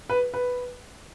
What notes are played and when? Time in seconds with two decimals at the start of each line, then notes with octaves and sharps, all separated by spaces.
0.10 B4
0.34 B4